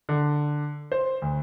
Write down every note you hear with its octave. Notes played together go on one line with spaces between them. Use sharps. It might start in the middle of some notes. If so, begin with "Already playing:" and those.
D3
C5
D2